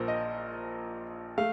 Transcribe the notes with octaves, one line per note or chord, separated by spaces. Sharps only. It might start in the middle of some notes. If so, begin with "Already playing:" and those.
Already playing: A#1 A#2 F3 A#4 C5
D#5
A3 F5